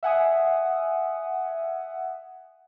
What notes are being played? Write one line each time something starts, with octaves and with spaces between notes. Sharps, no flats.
E5 F#5 G#5 D#6